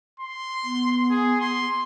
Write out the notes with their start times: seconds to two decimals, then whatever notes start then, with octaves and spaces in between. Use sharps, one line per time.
0.20 C6
0.64 B3
1.10 G#4
1.41 C6